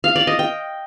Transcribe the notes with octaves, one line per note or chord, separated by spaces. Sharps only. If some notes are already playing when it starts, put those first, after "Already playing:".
F5
D5
D#5
G5